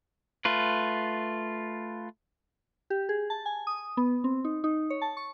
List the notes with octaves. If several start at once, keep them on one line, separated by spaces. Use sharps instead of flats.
A3 F4 B4
G4
G#4
A5
G#5
D#6
B3
C4
D#4
D#4
C#5
A5
C#6